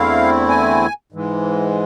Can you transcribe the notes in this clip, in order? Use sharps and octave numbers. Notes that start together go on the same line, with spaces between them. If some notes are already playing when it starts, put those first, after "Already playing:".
Already playing: E2 D3 A3 C4 E4 F5
G#5
G#2 E3 G#3